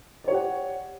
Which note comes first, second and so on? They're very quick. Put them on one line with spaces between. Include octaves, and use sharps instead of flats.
D5 C#5 G4 F#5